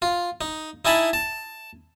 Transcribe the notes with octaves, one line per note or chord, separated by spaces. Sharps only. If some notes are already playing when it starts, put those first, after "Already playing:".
F4
D#4
D#4 E4 G#5 A5 B5
A5